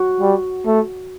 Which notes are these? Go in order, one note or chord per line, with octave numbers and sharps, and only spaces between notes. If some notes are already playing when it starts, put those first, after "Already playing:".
Already playing: F#4
G3
A3